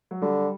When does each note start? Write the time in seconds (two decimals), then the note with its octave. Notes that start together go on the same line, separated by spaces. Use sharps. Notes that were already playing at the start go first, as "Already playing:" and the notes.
0.11 F#3
0.22 D3 G3